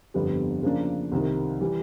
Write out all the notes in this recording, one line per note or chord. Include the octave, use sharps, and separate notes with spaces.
G1 F2 D3 G3 B3
C#3 F3 A#3 D4
C2 C3 D#3
E3 G3